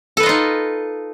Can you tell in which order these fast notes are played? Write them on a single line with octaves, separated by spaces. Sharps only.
A4 B4 D#5 F4 D#4